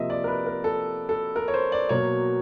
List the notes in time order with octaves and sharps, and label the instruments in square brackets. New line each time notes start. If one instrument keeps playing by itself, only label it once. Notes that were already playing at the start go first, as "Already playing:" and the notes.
Already playing: [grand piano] C3 F3 A#3 D#5 E5
D5
A#4
B4
A#4
A4
A4
A#4
C#5
C5
D5
B2 F#3 A#3 C#5